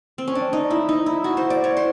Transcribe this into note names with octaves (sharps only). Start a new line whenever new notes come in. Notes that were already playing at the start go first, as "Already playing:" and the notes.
C4
C#4
D4
D#4
E4
D#4
E4
F#4
C5
D5
C#5
C5